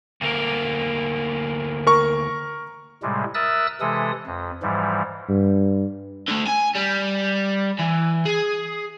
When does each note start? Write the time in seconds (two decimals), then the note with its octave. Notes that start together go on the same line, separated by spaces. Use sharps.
0.21 D2 A#3
1.87 A#4 C#6
3.03 A2 C3 G3 G#3
3.34 A#4 E5 D#6 E6 F#6 A6
3.81 C3 E3 G#3 A4 D#6
4.26 F2
4.63 G#2 E3 F3 G3
5.29 G2
6.28 D3 A3
6.47 G#5
6.76 G3
7.79 E3
8.25 G#4